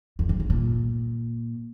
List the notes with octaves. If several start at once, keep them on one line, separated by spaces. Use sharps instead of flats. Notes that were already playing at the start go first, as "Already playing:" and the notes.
F2
G2
G#2
A#2